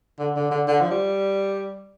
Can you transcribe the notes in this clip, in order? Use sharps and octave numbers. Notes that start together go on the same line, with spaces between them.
D3
D3
D3
D3
F3
G3